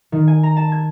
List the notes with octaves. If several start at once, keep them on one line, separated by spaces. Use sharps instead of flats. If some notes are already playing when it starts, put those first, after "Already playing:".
D#3
G#5
A#5
A5
G#6